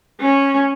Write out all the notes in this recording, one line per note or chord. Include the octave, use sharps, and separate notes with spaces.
C#4